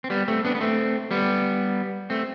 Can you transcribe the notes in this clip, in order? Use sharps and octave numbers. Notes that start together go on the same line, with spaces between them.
C4
G3 B3
A3 C4
B3 D4
B3
A3 C4
G3 B3
A3 C4